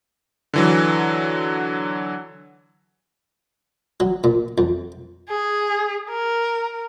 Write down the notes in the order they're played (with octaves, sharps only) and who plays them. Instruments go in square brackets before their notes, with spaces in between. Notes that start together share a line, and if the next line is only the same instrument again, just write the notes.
[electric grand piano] D3 E3 F#3
[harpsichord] F#3
A#2
F2
[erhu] G#4
A#4